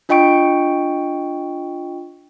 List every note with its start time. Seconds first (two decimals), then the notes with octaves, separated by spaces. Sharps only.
0.09 D4 F4 D#5 G5 C#6 D7